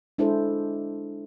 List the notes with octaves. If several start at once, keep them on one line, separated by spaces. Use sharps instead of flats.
G#3 D4 E4 G#4 A4 C5